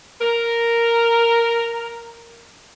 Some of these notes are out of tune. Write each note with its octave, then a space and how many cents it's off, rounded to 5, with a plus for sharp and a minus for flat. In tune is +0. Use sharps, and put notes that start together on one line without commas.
A#4 -5